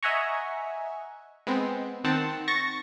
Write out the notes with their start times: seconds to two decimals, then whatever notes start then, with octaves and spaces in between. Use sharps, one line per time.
0.03 D#5 E5 F#5 G#5 A#5 C#6
1.47 G#3 B3 C4
2.04 D#3 C4 F#5 A5
2.48 C#6 A6 A#6